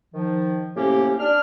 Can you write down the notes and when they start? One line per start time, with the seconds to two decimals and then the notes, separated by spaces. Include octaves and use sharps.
0.14 D#3 F3
0.76 A2 C3 A#3 C#4 G4
1.20 D4 F6